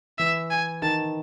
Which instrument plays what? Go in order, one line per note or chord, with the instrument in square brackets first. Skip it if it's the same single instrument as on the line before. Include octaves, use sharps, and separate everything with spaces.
[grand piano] E3 [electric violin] E5
[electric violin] G#5
[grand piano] D#3 [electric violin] A5